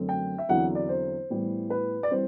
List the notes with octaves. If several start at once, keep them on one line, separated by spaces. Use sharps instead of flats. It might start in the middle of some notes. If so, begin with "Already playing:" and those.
Already playing: F#2 D3 A3 C4
G5
E5
E2 D3 F#3 C4 F#5
D5
C5
A2 E3 G3 B3
B4
D5
E3 G3 C4 C5